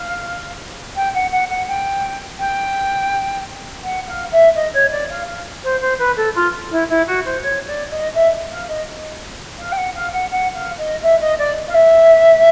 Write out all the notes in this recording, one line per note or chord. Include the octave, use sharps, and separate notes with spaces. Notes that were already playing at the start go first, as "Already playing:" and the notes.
Already playing: F5
G5
F#5
F#5
F#5
G5
G5
F#5
F5
E5
D#5
C#5
D5
F5
F5
C5
C5
B4
A4
F4
E4
E4
F#4
C5
C#5
D5
D#5
E5
F5
D#5
F5
G5
F#5
F5
F#5
F#5
F5
D#5
E5
D#5
D5
F5
E5